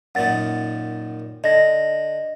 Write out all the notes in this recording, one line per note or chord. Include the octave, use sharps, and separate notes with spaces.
F#2 A#2 D#3 F#5 A6
D3 D#5 A#6